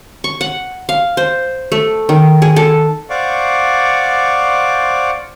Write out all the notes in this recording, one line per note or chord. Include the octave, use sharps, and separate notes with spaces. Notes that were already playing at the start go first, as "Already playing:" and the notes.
C#6
F#5
F5
C5
A3
D#3
G#4
A4
C5 D5 F5 F#5 C#6 D6